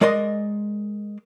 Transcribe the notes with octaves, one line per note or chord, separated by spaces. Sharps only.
G#3 A#4 D5 D#5 C6